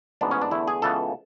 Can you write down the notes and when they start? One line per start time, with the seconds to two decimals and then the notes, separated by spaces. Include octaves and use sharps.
0.21 A1 G#2 G#3 B3 D4
0.31 C#4
0.42 D4
0.51 E2 D3 A3 E4
0.68 G#4
0.82 C#2 C#3 E3 B3 A4